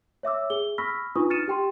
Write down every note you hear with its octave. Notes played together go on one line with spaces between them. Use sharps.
C#5 E5 D6 E6
G#4 G7
B5 C#6 E6 F6 A#6 B6
D4 D#4 F4 B4 C#6 D#6
F6 A6 C#7 D#7 E7
G4 G5 C6